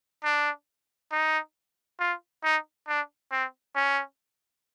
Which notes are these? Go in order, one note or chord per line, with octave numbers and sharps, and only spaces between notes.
D4
D#4
F4
D#4
D4
C4
C#4